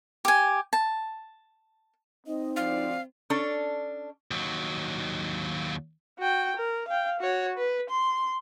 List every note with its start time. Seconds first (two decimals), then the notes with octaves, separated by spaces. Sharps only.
0.25 G4 G#5
0.73 A5
2.27 C4 D#4 D#5
2.56 D2 F3 D5 F5
3.30 C#4 D4 A4
4.31 D#2 F#3
6.19 F#4 G5
6.56 A#4
6.88 F5 G5
7.20 F#4 C#5
7.58 B4
7.90 C6